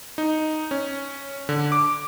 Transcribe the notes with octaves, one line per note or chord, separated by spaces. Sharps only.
D#4
C#4
D3
D6